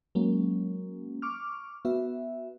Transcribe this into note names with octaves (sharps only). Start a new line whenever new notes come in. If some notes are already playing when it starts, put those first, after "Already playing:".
F#3 G#3 A#3 C#4
C#6 D6 F6
B3 F#4 E5